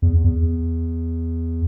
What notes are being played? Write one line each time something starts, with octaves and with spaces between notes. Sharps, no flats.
E2
E2